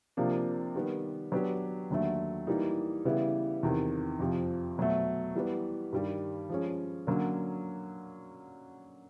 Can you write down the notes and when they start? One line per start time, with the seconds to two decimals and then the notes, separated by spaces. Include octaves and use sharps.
0.17 C3 F3 A#3 D4
0.75 D#3 G3 B3
1.32 F#3 B3 D4 G4
1.90 D#2 D3 F#3 A3
2.47 E3 G3 A#3 D#4
3.05 C#3 E3 G3 B3 E4
3.63 E2 C3 D#3
4.19 F2 C3 F3
4.78 B2 F#3 A3
5.35 E3 G3 B3
5.93 G2 D#3 G3
6.49 F3 G#3 C#4
7.07 D3 F#3 A#3 C#4